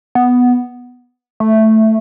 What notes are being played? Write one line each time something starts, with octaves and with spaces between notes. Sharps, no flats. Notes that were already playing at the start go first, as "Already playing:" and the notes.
B3
A3